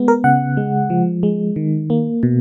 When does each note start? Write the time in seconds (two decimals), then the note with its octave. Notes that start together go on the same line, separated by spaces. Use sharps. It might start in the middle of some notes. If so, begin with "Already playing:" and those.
Already playing: G#3 B3
0.08 A#4
0.24 C#3 F#5
0.57 G#3
0.90 F3
1.23 G#3
1.56 D#3
1.90 A#3
2.23 B2